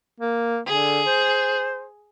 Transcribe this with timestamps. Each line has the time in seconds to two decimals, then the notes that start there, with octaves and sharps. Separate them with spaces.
0.20 A#3
0.67 D3 G#4
1.06 C5